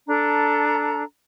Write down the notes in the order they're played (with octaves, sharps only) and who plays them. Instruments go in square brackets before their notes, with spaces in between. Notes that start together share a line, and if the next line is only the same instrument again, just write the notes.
[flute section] D4 A4 A#5